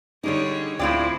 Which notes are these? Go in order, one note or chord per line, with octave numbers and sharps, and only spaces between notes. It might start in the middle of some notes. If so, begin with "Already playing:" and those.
D3 G3 D4 D#4 G#4 C#5
D2 A2 C4 E4 F4 D5 G5